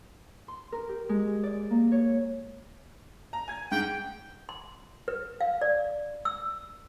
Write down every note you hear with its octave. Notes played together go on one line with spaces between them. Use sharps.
C6
A#4
G4
G#3
D5
A#3
C#5
A#5
G#5 G#6
G#2 F#5 G5
C6
B4
F5
D5
E6